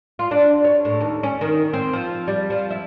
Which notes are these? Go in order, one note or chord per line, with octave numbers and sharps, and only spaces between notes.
F4
D4
C#5
A2
D#2
C#4
D#3
C4
F3
G3
F3
E4